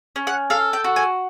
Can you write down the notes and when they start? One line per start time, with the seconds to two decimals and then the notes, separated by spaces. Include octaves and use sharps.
0.16 C#4
0.27 F#5
0.50 A4 F5
0.73 G5
0.84 F#4
0.96 G#5